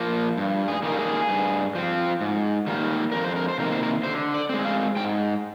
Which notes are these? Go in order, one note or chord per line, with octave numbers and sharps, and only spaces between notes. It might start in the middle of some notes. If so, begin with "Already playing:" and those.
Already playing: F3 A#3
G2
G#4
D#3 G3 A#3 A#4
G#4
G2
F3 C4
G#2
D#3 G3 A#3
F2 A#4
C5
A#4
C5
C3 D#3 A#3 A#4
C5
A#4
D3 C5
D5
G#3 C4
F5
G#2 G5